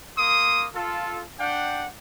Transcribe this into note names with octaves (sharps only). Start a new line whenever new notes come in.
A#3 C6 D#6
F4 A4
D4 F#5 G5